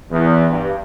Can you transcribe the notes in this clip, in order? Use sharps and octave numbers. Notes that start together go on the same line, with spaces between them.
E2
G2